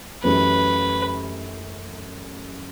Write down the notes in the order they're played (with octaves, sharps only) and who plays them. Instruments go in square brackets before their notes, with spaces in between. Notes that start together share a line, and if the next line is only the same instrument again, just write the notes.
[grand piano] F#2 E3 A3 C#4 G4 [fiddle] B4